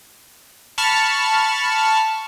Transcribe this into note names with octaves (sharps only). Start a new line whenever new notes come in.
A5 B5 C#6 F6